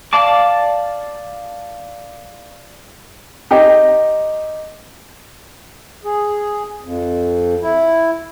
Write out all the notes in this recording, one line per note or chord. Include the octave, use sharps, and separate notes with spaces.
D5 F5 A5 D6
D#4 G4
G#4
F2
E4